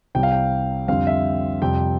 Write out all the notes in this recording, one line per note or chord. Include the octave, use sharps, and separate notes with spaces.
C2 C3 G3 G5
F5
G5
F2 D3 G3 C4 F5
E5
F2 C3 G3 C4 G5